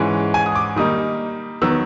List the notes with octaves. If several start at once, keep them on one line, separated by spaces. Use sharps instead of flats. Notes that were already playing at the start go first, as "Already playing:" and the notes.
Already playing: G#2 E3 G#3 C#4
G#5
D#6
D6
D#3 G3 A#3 D#4 D#6
D#3 F#3 B3 E6